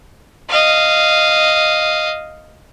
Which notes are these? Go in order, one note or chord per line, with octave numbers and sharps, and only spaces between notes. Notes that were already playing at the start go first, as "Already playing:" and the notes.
D#5 F5